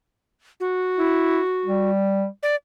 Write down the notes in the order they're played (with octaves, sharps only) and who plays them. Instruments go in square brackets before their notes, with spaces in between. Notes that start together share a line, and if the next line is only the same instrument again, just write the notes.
[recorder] F#4
[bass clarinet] E4
G3
[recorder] D5